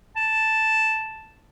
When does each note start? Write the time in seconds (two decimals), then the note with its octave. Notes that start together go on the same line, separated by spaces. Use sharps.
0.16 A5